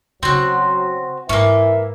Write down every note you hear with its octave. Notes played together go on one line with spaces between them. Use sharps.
C#3 F#3 C4 C#4 F#4
G#2 E3 A#3 C#4 E5